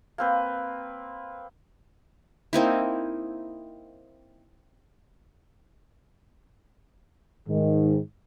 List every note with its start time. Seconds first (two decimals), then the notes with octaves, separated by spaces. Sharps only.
0.18 A#3 C4 B4
2.53 A#3 C4 D#4 E4
7.49 G#2 D#3